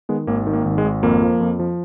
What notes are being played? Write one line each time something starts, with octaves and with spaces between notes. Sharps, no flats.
D#3 G#3 B3
G#1 A#3
D#3
A#3
G#1
G#3
G#1
F2 A#3
F3
F2
F3